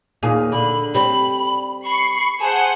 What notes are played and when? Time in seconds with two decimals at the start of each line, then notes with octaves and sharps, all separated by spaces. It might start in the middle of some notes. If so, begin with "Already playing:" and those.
0.22 D#2 A#2 G#4
0.52 D3 B5
0.95 G3 C4 B5
1.85 B5 C#6 C7
2.40 G#4 C5 F#5 A5